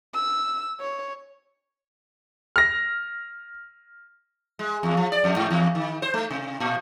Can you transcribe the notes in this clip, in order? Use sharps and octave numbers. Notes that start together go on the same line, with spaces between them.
E6
C#5
F6 A#6
G#3
E2
F3
D5
F2
G#2
E2
D#3
C5
A3
C3
A#2